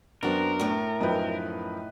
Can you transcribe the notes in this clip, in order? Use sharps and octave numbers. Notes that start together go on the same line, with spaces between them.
F#2 B3 C4 D4 F#4 A#4
A2 A3
F#2 F3 D#4 B4 G5